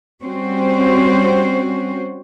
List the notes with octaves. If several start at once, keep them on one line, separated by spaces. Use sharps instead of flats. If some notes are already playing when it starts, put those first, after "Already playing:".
G3 C4 C#4 F#4 C5